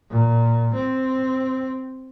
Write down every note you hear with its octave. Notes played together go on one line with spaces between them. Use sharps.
A#2
C4